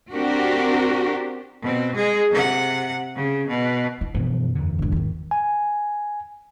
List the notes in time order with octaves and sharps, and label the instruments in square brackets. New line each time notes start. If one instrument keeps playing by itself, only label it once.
[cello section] C4 D4 F#4 G4 A#4
[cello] B2 C4
G#3 G#4
C3 F#5
C#3
B2
[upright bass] E4
[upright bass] F#2 [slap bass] B2 E3 F3
[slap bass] E2 D3
[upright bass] G2 G#3
G#2 D#3
[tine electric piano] G#5